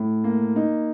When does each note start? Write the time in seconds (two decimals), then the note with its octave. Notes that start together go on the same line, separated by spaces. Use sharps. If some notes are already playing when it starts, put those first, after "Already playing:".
Already playing: A2
0.24 A#3
0.56 D#4